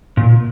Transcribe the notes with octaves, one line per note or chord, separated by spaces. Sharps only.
A#2